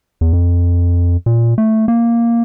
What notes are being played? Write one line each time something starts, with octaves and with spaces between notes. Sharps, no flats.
E2
F2
A#2
A3
A#3